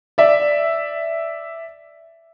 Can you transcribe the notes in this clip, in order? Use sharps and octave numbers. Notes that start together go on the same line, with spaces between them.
D5 E5